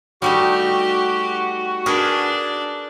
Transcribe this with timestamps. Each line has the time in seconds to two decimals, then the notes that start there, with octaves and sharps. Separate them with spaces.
0.22 G3 A3 D#4 F#4 G4
1.86 D4 G#4 A#4 B4